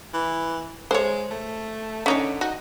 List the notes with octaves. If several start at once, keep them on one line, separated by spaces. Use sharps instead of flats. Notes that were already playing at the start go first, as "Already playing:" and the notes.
E3
G#3 C5 C#5
A3
D3 C#4 D#4 C#5
D#4 F#4